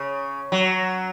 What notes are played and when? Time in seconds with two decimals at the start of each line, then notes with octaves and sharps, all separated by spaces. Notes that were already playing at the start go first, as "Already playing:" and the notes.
Already playing: C#3
0.52 F#3